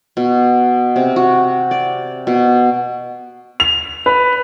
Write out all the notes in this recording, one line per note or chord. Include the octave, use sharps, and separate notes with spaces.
B2
C3
F#4
D5
B2
F7
B4